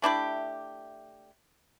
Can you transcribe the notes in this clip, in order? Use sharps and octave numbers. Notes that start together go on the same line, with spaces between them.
A3 D4 E4 G4